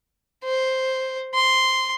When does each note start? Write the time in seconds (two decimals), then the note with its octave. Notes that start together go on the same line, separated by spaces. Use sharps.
0.44 C5
1.34 C6